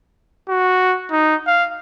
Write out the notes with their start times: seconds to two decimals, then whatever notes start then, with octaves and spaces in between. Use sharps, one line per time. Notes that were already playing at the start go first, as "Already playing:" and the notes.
0.49 F#4
1.11 D#4
1.47 F5